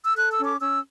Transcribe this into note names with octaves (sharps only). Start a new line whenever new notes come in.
E6
A4 F#6
E6
C#4
D6
C#4 E6